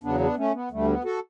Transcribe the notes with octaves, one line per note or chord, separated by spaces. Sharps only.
E2 C#3 F#3 B3 D4
B3 D4
A3 C#4
B3
D2 D3 G3 A3
B3
F#4 A4